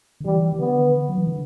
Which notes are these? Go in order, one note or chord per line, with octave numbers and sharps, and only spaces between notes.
D3
E3 G3
E3
D3 B3
F#3
E3
D3